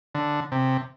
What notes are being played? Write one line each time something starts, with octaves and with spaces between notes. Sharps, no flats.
D3
C3